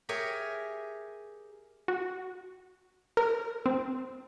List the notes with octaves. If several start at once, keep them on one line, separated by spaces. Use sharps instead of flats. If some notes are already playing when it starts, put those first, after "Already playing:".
G4 G#4 A#4 C#5 E5 G#5
F#4
A#4
C4